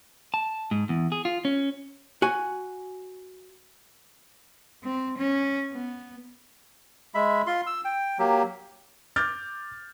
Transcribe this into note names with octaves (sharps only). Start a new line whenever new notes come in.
A5
G#2
E2
G#4
F4
C#4
F#4 G#5
C4
C#4
B3
G#3 E5 B5
F4 C6
E6
G5
F#3 A#3 G4
D6 F6 G6 A6